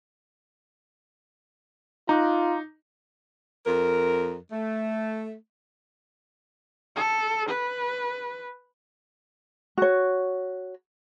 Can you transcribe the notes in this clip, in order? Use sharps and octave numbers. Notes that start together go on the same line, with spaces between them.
D#4 F4 A#5 D6 F#6
F2 A#4
A3
A4
B4
F#4 C#5